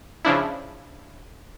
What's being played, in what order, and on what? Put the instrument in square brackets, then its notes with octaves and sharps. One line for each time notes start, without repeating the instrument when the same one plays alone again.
[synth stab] C#3 F3 D4 E4